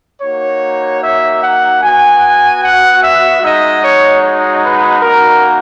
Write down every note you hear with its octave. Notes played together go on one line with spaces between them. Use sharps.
A#3 D#4 F#4 C#5
E5
F#5
B3 F#4 G#5
F#5
E5
G#3 D#4 F#4 D#5
C#5
C#5
B4
A#3 D#4 F#4 A#4